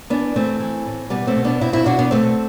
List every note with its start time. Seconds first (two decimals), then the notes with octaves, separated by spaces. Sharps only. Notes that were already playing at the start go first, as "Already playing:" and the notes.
0.10 E3 B3 D4
0.35 E3 A3 C4
0.60 E3
0.85 A2
1.10 B2 G3 B3
1.27 A3 C4
1.36 B2
1.44 B3 D4
1.61 B2 C4 E4
1.73 C4 E4
1.86 B2 D4 F#4
1.99 B3 D4
2.11 B2 A3 C4